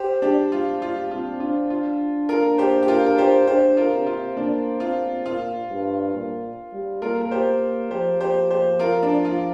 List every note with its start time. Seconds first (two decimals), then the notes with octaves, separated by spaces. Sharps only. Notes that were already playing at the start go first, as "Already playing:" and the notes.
Already playing: G4 C5
0.22 G3 D4 G4
0.52 G3 F4
0.81 G3 F4
1.11 C4 F4
1.40 D4 F4
1.70 F4
2.29 F4 A#4
2.58 G4 C5
2.83 G4
2.88 F4 A#4
3.06 A#4
3.18 G4 C5
3.47 D4 G4 C5
3.77 F4 A#4
3.92 C3
4.07 F4
4.37 A#3 D4
4.80 C4 F4
5.25 A#2 F4
5.69 G2
6.14 A#2
6.72 G3
7.02 A#3 F4 A#4
7.21 A#4
7.31 G4 C5
7.47 A#3
7.91 F3 G4 C5
8.21 G4 C5
8.50 G4 C5
8.79 F4 A#4
9.03 D4
9.25 F4